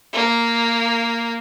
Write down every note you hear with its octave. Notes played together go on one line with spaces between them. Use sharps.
A#3